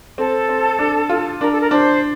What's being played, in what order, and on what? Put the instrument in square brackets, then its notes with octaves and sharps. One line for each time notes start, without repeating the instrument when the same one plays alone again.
[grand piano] C4 [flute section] A4
[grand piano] C4
D4
F4
[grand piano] D4 [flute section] A#4
[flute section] A4
A#4
[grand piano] D4 [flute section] C5